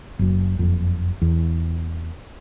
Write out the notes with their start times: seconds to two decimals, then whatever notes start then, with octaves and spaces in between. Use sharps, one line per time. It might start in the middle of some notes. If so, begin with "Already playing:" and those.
0.19 F#1 F#2
0.59 F#1 F2
1.22 E2